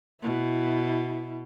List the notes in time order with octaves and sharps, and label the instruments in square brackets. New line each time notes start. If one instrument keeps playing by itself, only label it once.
[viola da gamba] B2 [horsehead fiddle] E4